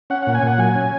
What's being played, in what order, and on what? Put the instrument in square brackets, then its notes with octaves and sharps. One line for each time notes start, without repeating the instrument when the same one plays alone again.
[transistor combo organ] C#4 F#5
A#2 F#5
G#5
A#2 F#5
F#3 G#5
C#4